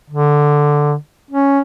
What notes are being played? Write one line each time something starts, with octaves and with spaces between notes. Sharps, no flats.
D3
C#4